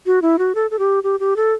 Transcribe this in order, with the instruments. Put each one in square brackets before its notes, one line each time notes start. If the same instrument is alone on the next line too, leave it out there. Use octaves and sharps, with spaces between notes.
[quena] F#4
E4
F#4
A4
A4
G4
G4
G4
A4